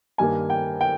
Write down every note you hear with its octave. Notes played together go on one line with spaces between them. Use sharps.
G2 D#3 A#3 G#5
G5
G5